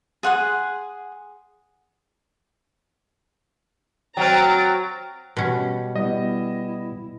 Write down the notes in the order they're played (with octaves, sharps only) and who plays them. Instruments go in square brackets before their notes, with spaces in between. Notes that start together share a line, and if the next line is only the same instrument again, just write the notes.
[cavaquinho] G#4 F#5 C6 D#6
[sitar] F#3 C4 [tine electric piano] G5 F6 [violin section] A#5 A6 D7
[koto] B2 C#4 [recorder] G3
[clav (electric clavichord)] G3 B3 [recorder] E4 [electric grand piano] D#5